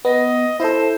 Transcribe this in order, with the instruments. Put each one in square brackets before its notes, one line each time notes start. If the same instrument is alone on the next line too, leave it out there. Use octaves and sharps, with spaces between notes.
[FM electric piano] B3 [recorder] D#5
[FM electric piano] E4 A4 [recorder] C5